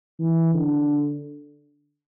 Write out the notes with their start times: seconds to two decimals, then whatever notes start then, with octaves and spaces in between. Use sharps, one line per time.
0.20 E3
0.54 D3